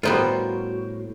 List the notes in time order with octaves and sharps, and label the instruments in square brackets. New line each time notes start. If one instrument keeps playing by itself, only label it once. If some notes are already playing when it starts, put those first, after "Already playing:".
[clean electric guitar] A2 [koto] G3 B3 F4 [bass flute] F#4 [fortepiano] A#4 C5